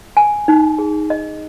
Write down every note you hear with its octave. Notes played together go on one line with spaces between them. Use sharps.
G#5
D#4
G#4
D#5